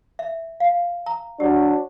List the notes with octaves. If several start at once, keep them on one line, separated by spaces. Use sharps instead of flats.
E5
F5
A#5
F#3 D4 G4